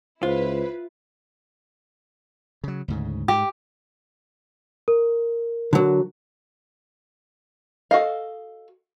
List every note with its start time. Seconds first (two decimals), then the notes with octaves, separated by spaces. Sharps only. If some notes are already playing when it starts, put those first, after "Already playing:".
0.23 C#2 E4 F4 B4 C5
2.64 C#3 F#3
2.88 D2 G#2 C#3
3.28 G#2 G4
4.88 A#4
5.73 D3 F#3
7.91 F#4 A4 D#5 F5